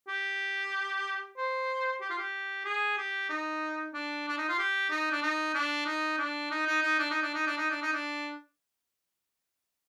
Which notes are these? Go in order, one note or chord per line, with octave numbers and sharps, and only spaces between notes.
G4
C5
G4
F4
G4
G#4
G4
D#4
D4
D4
D#4
F4
G4
D#4
D4
D#4
D4
D#4
D4
D#4
D#4
D#4
D4
D#4
D4
D#4
D4
D#4
D4
D#4
D4